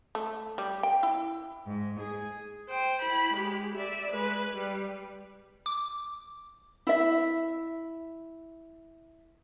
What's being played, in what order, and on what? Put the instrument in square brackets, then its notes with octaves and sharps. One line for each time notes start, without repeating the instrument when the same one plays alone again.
[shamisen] A3
G3
G5
E4
[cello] G#2
G#4
[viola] C5 G5
E4 B5
G#3 G4
D5 E5
G#3 B4
G3
[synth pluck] D6
[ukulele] E4 E5